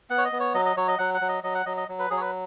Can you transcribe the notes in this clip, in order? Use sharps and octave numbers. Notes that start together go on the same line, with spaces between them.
B3 F#5
C#5
D#5
B3
C#5
F#3 D#5
D#5
F#3 C#5
D#5
F#3 F#5
F#5
F#3
D#5
F#3 D#5
F#5
F#3 D#5
D#5
F#3
B4
F#3 G#4
C#5
B4